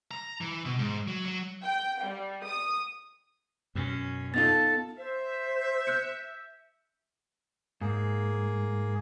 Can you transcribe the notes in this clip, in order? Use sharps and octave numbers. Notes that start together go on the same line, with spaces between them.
A#5
E3
B2
G#2
F#3
F#3
G5
G3
D#6
F#2 B2 C#4
B3 D#4 F4 A4 A5 A6
C5 E5
F#6 G6 C#7
G#2 A#3 G#4